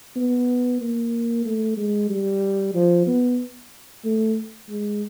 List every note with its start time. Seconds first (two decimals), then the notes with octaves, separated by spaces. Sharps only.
0.16 B3
0.80 A#3
1.45 A3
1.78 G#3
2.09 G3
2.75 F3
3.07 B3
4.04 A3
4.69 G#3